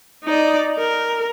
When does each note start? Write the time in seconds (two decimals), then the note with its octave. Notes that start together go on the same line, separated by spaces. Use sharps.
0.24 D#4 D5
0.78 A#4